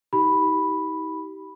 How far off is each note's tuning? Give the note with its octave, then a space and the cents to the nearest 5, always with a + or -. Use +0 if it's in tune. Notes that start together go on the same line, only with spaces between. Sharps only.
D#4 +40 G4 -20 B5 +0